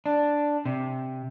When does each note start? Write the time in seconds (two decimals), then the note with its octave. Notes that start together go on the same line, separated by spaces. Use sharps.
0.06 D4
0.65 C3